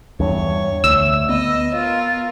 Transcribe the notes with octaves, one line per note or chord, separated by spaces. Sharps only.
E2 G2 C#5
D2 E6
B3 D#5
F4 A#4